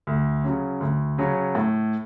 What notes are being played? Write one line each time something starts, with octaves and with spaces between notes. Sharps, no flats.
D2
C#3 F#3 C#4
D2
C#3 F#3 C#4
A2